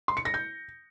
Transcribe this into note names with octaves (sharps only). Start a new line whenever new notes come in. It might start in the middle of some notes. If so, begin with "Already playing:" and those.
C6
C#7
A#6
G6